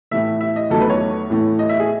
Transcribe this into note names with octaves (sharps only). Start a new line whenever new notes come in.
A2 E3 A3 E5
E5
D#5
E2 D#3 F#3 A3 A4
B4
C#5
A2 E3 A3
D#5
E5
G#4